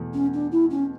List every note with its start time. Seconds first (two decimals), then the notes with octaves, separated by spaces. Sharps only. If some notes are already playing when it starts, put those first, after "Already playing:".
Already playing: E2 B2 A3
0.14 C#4
0.34 D4
0.52 E4
0.71 C#4